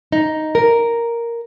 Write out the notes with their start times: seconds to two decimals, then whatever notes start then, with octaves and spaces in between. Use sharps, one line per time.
0.12 D#4
0.55 A#4